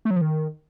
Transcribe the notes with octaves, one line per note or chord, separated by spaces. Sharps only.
A3
F#3
F3
D#3